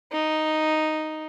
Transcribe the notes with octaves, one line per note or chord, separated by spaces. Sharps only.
D#4